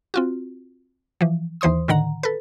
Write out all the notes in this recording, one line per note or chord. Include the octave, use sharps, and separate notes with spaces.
C4 F4 F#4
E3 F3
D#2 E3 C5 C6 D#6
A2 D3 D#3 F#5 A#5
A4 B4